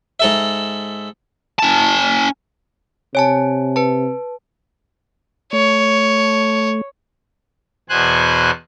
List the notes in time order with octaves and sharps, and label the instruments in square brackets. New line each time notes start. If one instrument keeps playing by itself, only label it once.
[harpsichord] G#2 A4 E5
[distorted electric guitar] C#4 A5
[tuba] C3 [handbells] C#5 G#5 A5
[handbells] B4 A5
[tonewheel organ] A3 [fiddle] C#5
[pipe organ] E2 B2 C5 G#5 F#6